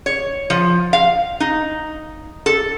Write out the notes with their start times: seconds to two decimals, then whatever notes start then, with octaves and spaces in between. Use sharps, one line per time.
0.06 C#5
0.50 F3
0.93 F5
1.40 D#4
2.46 A4